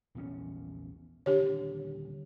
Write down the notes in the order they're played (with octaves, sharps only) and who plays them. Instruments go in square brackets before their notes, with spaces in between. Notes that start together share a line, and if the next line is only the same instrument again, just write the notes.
[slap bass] A#1 E2 C#4
[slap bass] D#1 D3 [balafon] D4 G4 C#5